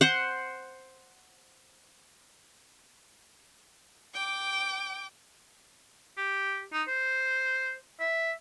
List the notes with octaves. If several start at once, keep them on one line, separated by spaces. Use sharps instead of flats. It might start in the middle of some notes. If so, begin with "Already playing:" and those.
C5 F#5
G5 D6
G4
D#4
C5
E5